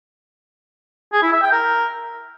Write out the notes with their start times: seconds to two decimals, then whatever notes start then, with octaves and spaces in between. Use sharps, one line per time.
1.13 G#4
1.23 E4
1.33 E5
1.42 G5
1.52 A#4